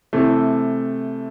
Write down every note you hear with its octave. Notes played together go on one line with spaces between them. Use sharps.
C3 E3 A3